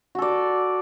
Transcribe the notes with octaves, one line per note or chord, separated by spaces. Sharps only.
F#4 A4 D5